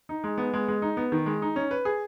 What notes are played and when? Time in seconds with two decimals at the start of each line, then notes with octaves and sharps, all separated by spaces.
0.09 D#4
0.24 G#3
0.38 B3
0.53 G#3
0.68 G#3
0.82 D#4
0.97 B3
1.12 D#3
1.26 G#3
1.42 D#4
1.56 C#4
1.71 B4
1.85 G#4